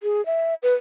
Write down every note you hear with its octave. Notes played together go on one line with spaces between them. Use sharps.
G#4
E5
B4